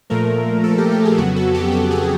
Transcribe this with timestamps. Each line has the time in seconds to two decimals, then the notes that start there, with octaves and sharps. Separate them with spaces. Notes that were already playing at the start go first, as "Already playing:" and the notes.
0.10 A#2 F3 A3 A#4
0.64 A4
0.78 G4
0.92 G4
1.05 G#4
1.18 F2 C#3 F#3 B3 F#4
1.36 A4
1.54 G4
1.72 G4
1.91 G#4